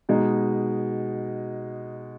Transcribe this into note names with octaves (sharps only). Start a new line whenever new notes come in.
B2 G#3 D#4